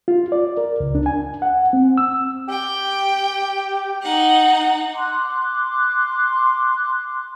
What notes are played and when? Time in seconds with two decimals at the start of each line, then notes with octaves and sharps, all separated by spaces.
0.08 F4
0.32 D5
0.57 A#4
0.80 C#2
0.95 D4
1.06 G#5
1.42 F#5
1.73 C4
1.98 E6
2.49 G4 G5
4.01 D#4 F#5
4.94 C6 D6 F#6